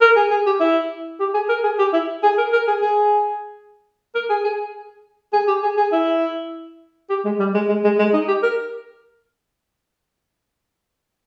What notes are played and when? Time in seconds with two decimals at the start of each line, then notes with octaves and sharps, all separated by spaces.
0.01 A#4
0.16 G#4
0.31 G#4
0.46 G4
0.60 E4
1.20 G4
1.34 G#4
1.49 A#4
1.64 G#4
1.79 G4
1.93 E4
2.23 G#4
2.38 A#4
2.53 A#4
2.67 G#4
2.81 G#4
4.15 A#4
4.30 G#4
4.44 G#4
5.33 G#4
5.47 G4
5.63 G#4
5.77 G#4
5.92 E4
7.10 G4
7.25 G#3
7.39 G3
7.54 G#3
7.69 G#3
7.84 G#3
7.99 G#3
8.14 D#4
8.28 G4
8.43 A#4